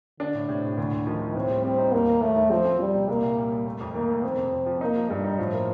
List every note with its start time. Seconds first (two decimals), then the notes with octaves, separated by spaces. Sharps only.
0.20 D3 D4
0.34 A2
0.49 A2 C3
0.63 A2
0.77 D2 D3
0.93 D2
1.06 D#3 F3
1.20 F3
1.35 A2 C4
1.50 G3
1.64 G3 C4
1.78 D#4
1.93 D#2 A#3
2.07 D#3
2.21 D#2 A3
2.36 D#2
2.50 F3 C4
2.65 C4
2.79 G3 C4
2.94 C3
3.08 C2 A#3
3.22 A#2
3.36 G3
3.52 G3
3.66 A3
3.80 F2
3.94 D#3 A#3
4.08 A3
4.23 F2 C4
4.38 C3
4.53 F2
4.66 F3
4.81 A#3 D#4
4.96 F3
5.10 G2 G3
5.24 D#4
5.39 A2 F3
5.53 A#3